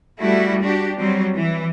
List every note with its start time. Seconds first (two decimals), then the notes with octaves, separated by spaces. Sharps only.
0.21 G3 A3 E4 F#4
0.64 D4 F#4 G4
0.97 F#3 G3 C4
1.35 E3